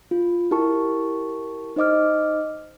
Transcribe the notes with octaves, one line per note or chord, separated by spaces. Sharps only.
F4
E4 G4 A#4 A5 C#6
D#4 C5 D#5 D6 F6